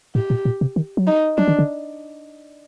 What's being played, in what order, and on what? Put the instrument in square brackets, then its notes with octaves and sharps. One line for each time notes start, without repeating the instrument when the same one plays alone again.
[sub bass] A2 [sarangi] G4
[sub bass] A#2
A#2
C3
D#3
F#3
[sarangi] D#4
[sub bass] F#3 [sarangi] D4
[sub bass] D#3
D3